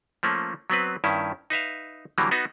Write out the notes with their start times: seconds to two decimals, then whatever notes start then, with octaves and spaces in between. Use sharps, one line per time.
0.23 F3 A3 A#3 C#4
0.70 F#3 B3 C4 B4
1.04 G2 D#3 C#4 E4
1.50 D#4 B4 E5 F5
2.18 D3 E3 F#3 G3 A#3
2.31 B3 D#4 F#4